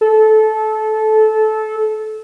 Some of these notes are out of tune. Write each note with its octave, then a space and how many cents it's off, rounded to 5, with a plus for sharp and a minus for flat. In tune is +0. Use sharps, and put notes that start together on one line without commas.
A4 -20